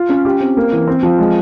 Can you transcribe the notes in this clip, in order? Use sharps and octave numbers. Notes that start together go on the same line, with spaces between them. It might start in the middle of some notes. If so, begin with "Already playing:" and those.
Already playing: F4
C#4
G4
C4
A#3
E3
C4
F3
G#3